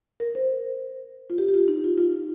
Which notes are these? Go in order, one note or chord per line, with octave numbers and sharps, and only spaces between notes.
A#4
C5
F4
G4
G4
F4
D#4
F4
F4